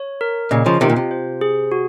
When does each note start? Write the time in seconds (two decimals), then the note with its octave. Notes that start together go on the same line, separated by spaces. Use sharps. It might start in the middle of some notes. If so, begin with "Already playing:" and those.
Already playing: C#5
0.21 A#4
0.51 A#2 C#3 D#5
0.66 C#3 F3
0.81 C3 D#3 F4
0.90 A#2
0.96 C3
1.11 C5
1.41 G#4
1.72 F#4